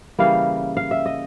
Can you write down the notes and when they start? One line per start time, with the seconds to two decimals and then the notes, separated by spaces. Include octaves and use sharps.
0.19 C#3 E3 G3 A#3 F5
0.77 F5
0.91 E5
1.06 D#5